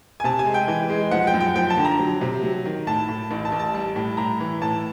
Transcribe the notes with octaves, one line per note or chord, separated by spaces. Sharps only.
G#5
C3 A5
G#5
G#3
G5
E3
G#3
F3 F#5
G5
F#2
G5
F3 G5
A5
D3
A#5
F#3
C3
F#3
D#3
A2 A5
A2
A1
A5
A1
A5
G3 A5
A2
A2 A#5
E3
A2 A5